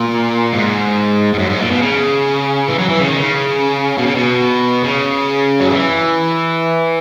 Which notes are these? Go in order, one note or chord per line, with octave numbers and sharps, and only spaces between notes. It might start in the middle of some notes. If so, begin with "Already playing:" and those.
Already playing: A#2
G#2
G#2
F#2
G#2
A#2
B2
C#3
E3
F#3
E3
C#3
D#3
C#3
B2
C#3
B2
C#3
F#3
E3